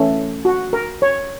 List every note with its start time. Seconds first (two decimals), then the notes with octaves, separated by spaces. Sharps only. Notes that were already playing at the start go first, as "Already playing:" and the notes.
Already playing: E3 A3 C#4
0.45 F#4
0.73 A#4
1.02 C#5